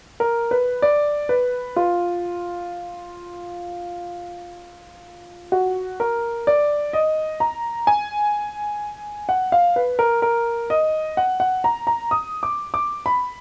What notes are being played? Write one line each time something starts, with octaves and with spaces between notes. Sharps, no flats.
A#4
B4
D5
B4
F4
F#4
A#4
D5
D#5
A#5
G#5
F#5
F5
B4
A#4
A#4
D#5
F#5
F#5
A#5
A#5
D#6
D6
D6
B5